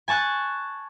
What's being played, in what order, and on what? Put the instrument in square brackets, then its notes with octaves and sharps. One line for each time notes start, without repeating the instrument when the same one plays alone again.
[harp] G#5 A5 C#6 F#6